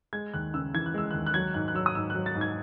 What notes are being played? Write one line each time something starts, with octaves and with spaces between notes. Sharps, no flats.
G#3 G#6
D#2 F#6
C#3 E6
E3 G#6
F#6
G#3 E6
D#2 F#6
F#6
F#3 G#6
G#2 F#6
F#6
F#3 E6
D#6
G#2 E6
F#3 F#6
A6
G#2
G#6